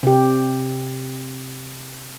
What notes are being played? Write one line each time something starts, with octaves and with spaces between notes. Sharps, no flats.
C3 G4